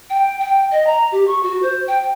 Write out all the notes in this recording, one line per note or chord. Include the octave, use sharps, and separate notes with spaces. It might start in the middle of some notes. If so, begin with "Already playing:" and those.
G5
G5
D#5
A#5
G4
C#6
F#4
C5
G5